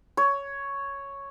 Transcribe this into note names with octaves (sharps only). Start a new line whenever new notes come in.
C#5